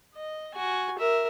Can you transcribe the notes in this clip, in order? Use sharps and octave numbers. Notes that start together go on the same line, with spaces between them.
D#5
F#4 G#5
A#4 E5